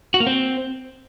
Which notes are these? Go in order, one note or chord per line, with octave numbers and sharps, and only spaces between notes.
F#4
A#3
C4